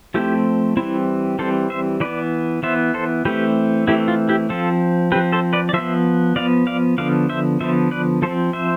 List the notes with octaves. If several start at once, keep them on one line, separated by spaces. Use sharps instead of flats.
F3 A3 C4 E4 G4
E3 G3 C4 E4
E3 G3 C4 A4 C5
C5 E5
E3 B3 B4 D5
E3 B3 C5 E5
A4 C5
E3 A3 C4 G4 B4
E3 A3 C4 E4 G4
F4
E4 G4
F3 C4 F4 A4
F3 C4 G4 B4
A4 C5
B4 D5
D5
F3 B3 C5 E5
F3 B3 D5 F5
D5 F5
D3 F3 B3 D5 F5
C5 E5
D3 F3 B3 C5 E5
B4 D5
F3 C4 A4 C5
C5 E5